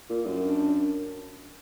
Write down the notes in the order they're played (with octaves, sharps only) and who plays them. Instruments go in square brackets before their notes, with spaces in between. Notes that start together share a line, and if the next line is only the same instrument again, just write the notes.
[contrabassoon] A#2
F#2
[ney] D4